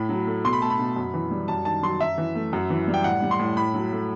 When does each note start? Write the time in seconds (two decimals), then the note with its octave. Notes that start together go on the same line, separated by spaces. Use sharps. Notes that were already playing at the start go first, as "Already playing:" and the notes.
Already playing: A2 B5
0.09 F#3
0.27 A3
0.44 B2 C6
0.53 B5
0.62 A3 A5
0.70 B5
0.79 B2
0.96 F#2
1.14 E3
1.31 G3
1.48 F#2 A5
1.65 D#3 A5
1.83 F#3 C6
2.01 F#2 E5
2.18 E3
2.35 A3
2.53 F#2
2.70 E3
2.88 G3
2.94 G5
3.04 A2 F#5
3.22 G3
3.31 C6
3.39 A2
3.57 A2 B5
3.74 F#3
3.92 A3